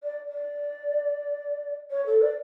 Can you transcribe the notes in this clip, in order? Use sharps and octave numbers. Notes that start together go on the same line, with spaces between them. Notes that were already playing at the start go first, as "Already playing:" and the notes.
D5
D5
C#5
A4
D5